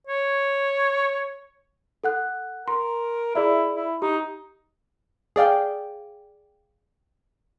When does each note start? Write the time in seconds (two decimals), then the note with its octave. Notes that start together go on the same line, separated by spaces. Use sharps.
0.07 C#5
2.04 A4 F#5 F#6
2.68 A#4 C6
3.35 E4 G#4 D5 E5
3.76 E4
4.02 D#4 G4
5.36 G#4 D5 F5 G5